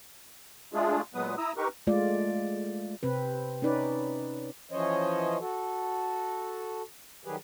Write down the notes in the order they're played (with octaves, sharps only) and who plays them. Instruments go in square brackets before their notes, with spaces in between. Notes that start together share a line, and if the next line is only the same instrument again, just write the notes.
[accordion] G#3 A3 D4 F4 G#4
A#2 F#3 G#3 B3 B4 D#6
E4 A#5 D#6 E6
D#4 G4 A#4 B4 C#6
[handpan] G#3 A3 F4 D5
C3 C4 B4
C#4 D#4 B4 D5
[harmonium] E3 F3 C#4 C5 C#5 D#5
F#4 A4
D#3 F#3 G3 G4 G#4 B4